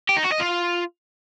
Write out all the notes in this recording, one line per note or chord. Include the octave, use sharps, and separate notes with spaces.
G4
D#4
F#4
D#5
F4